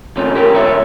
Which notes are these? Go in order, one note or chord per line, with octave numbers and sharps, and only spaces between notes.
D3 F3 A3 C#4
G4 A#4
C#5 E5